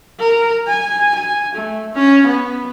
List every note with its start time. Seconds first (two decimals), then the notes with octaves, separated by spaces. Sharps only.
0.20 A#4
0.67 G#5
1.16 G#5
1.55 A3
1.94 C#4
2.27 B3